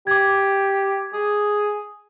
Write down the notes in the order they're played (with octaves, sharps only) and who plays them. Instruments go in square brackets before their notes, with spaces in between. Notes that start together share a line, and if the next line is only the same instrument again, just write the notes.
[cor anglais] G4 [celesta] D6 G#6
[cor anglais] G#4